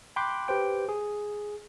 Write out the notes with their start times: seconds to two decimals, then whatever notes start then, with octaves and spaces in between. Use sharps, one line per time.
0.16 G5 B5 C6 D6 F#6 G6
0.48 G4 B4 C5 G5
0.89 G#4